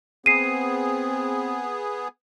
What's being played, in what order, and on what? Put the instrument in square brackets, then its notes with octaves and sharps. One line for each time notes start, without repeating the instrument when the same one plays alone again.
[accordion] B3 G#4 [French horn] C4 [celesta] C7 D#7